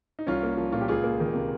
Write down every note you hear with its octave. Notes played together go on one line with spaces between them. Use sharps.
D#4
C2 C#4 F4
A#3
F3
A#2 F4
G4
C#2 F4 G#4
A#3
D#3
C3